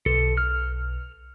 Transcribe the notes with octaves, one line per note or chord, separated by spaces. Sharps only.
B1 A4
F6